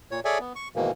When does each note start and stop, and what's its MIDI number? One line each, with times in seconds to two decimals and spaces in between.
0.11 0.20 46
0.11 0.20 73
0.25 0.38 68
0.25 0.38 69
0.25 0.38 73
0.25 0.38 74
0.25 0.38 76
0.25 0.38 80
0.40 0.53 59
0.55 0.68 85
0.76 0.91 44
0.76 0.91 47
0.76 0.91 51
0.76 0.91 52
0.76 0.91 58